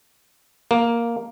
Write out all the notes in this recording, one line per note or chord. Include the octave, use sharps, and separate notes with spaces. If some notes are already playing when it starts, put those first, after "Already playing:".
A#3